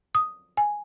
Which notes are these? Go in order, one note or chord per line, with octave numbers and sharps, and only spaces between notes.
D#6
G#5